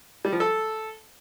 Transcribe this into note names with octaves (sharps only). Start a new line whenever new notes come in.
G3
F3
A4